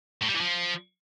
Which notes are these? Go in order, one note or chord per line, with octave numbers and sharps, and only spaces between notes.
A2
G3
E3
F3